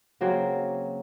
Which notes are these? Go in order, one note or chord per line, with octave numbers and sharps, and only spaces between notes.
C#3 F#3 A#3 C4